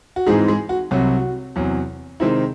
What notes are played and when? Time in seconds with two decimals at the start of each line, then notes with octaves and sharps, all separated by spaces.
0.16 F#4
0.26 G#2 E3 G#3 C4 D#4 G#4
0.48 G#3 G#4
0.69 F#4
0.91 C2 C3 F#3 F#4
1.56 E2 C3 F#3
2.20 C3 D#3 G#3 C4 D#4 E4